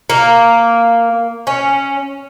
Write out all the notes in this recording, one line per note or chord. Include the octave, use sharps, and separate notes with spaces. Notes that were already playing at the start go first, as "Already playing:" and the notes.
A#3
C#4